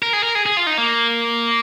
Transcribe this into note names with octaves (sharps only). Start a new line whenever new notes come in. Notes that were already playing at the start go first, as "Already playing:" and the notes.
A#4
G#4
A#4
G#4
G#4
F4
D#4
A#3